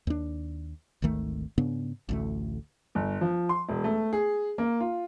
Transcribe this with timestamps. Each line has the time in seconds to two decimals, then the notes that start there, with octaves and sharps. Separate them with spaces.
0.07 D#2 D4
1.02 G#1 D2 D#3 A3
1.58 G#2 C#3 B3 D4
2.09 A1 D2 A3
2.95 G1
3.21 F3
3.49 C6
3.69 E1
3.84 A3
4.13 G#4
4.58 A#3
4.80 F4